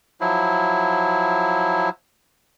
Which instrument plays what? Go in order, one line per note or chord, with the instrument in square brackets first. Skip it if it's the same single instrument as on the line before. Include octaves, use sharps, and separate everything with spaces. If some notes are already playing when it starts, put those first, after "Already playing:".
[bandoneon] F3 F#3 E4